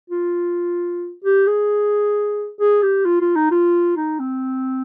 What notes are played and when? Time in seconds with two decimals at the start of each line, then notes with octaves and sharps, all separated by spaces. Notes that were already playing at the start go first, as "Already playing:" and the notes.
0.10 F4
1.24 G4
1.47 G#4
2.60 G#4
2.83 G4
3.06 F4
3.21 F4
3.36 D#4
3.51 F4
3.97 D#4
4.20 C4